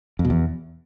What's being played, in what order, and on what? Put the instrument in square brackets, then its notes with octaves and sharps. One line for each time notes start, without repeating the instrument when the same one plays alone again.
[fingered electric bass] F2
B2
E2